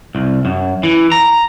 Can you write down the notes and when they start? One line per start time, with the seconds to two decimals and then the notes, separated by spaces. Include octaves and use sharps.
0.15 C2
0.45 F#2
0.83 E3
1.12 A#5